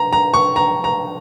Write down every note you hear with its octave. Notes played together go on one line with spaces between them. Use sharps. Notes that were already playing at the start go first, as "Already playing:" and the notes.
Already playing: A#5
A#5
C#6
A#5
A#5